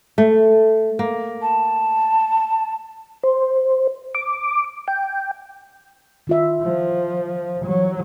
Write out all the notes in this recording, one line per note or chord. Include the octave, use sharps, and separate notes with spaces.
A3
A#3
A5
C5
D6
G5
D#3 F4 E5
F3
E3 F#3